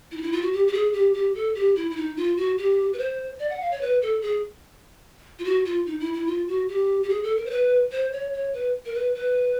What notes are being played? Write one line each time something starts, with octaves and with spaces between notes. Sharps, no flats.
E4
D#4
E4
F4
F#4
G4
G4
G#4
G4
G4
A4
G4
E4
E4
D#4
F4
F#4
G4
B4
C5
D5
F#5
F5
C#5
B4
A4
G#4
F4
F#4
F4
D#4
E4
E4
F4
F#4
G4
G4
G#4
A4
A#4
C5
B4
C5
C#5
C#5
B4
A#4
B4
B4